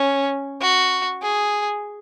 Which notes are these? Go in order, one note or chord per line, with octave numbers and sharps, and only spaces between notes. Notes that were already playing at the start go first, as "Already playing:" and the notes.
Already playing: C#4
F#4
G#4